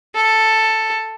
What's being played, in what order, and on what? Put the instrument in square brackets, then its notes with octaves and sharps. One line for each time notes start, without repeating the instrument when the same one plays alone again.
[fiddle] A4